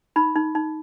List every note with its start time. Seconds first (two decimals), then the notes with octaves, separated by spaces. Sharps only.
0.16 D#4 B5
0.36 D#4
0.55 D#4